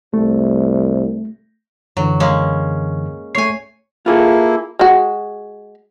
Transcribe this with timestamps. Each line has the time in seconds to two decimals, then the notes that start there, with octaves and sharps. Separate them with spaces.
0.14 C2 A3
1.97 F#2 D3 E3 F#3
2.20 G#3 A#3 C#4
3.35 A3 C#5 G#5 C#6 C7
4.06 A#3 E4 F4 G#4 A4
4.79 G#3 F#4